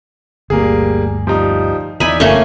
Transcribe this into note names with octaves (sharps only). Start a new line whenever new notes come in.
G1 D2 G3 A#3 G#4
F3 G3 D#4
E2 E3 D#4 E4 D5 G#5 B5
F#1 F2 F3 A3 A#3 C#4 G#5 G7